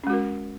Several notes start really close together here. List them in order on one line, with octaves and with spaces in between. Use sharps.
C#4 G#3 F#4 A#4